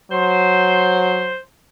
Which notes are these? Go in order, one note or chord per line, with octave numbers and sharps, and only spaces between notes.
F#3 C5